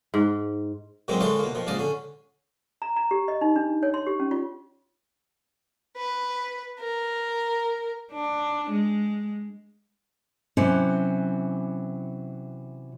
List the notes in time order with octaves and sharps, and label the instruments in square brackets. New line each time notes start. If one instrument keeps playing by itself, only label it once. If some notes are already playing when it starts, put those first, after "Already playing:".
[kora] G#2
[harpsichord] A#2 D#3 F#3 G#3 A#3 C4
D3 E3 G#3 D4 F4 C#5
B2 A#3
D#3 F3
A#1 G#2 C#3 D5 D#5 F5
D3 C#4
[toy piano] A#5
A#5
G4
D#5
D#4
D4
C#5
C6
G4
C#4
F4
[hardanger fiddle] B4
A#4
[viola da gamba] D4
G#3
[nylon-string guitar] C3 E3 F#3 C#4